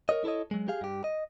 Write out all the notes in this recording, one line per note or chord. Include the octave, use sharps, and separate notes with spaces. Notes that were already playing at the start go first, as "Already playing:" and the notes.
A#4 C#5 D#5
E4 A4 B4 C#5 D#5
F#3 G#3
G4 G#4 F5
G2 G4
D#5